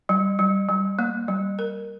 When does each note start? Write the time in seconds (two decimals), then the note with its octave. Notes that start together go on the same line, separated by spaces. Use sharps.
0.09 G3
0.39 G3
0.69 G3
0.99 A#3
1.28 G3
1.59 A#4